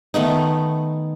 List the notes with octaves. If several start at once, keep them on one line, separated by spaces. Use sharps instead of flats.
D#3 A3 B3 D#4